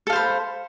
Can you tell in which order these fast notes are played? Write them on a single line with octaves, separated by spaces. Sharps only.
A4 F5 C5 B5